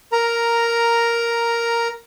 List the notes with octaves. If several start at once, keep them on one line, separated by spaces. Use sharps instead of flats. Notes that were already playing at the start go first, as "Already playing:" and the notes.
A#4 A#5